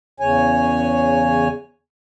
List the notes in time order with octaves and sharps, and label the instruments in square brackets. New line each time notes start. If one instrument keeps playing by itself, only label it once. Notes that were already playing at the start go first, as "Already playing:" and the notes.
[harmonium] E2 C#3 C#5 G#5